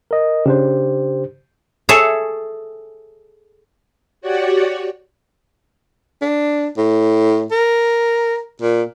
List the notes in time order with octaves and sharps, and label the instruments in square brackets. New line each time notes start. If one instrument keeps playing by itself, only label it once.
[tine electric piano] A#4 D#5
[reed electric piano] C#3 D4 [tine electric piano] G4 C5
[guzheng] G#4 A4 C#5 E5 A5
[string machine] F#4 G4 C#5 D5 F#5
[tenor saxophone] D4
A2
A#4
A#2